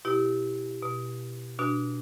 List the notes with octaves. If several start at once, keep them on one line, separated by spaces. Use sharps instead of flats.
B2 E4 G4
B2
B2 D4 F#4